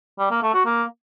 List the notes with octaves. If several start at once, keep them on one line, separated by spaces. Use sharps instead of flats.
G3
A#3
A3
F#4
A#3